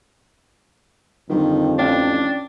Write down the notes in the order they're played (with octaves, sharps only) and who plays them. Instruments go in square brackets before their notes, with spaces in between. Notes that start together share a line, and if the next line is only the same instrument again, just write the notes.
[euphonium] F2 [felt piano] D3 G3 [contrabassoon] D#3
[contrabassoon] A1 [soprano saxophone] D4 [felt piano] C#5 F5 G5